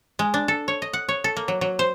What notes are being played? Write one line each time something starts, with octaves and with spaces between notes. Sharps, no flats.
G#3
D4
A4
C#5
D#5
F#5
C#5
A4
A#3
F#3
F#3
C5